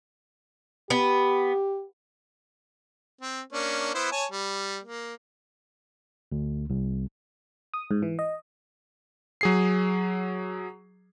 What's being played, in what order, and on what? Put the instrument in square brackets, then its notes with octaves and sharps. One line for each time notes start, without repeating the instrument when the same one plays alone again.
[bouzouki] B3 [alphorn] G4
[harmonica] C4
A#3 C#4 D4
B3 E4 C5
C#5 G#5 A5
G3
A#3
[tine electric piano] D2
C2
[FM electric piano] D#6
G#2
E3
D#5
[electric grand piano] F#3 G#4 C7